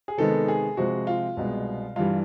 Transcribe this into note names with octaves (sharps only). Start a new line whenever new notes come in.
G#4
C3 D#3 G#3 B3 A4
G#4
C3 F3 G#3 F#4
F4
C2 B2 G#3 B3
G2 E3 G3 F4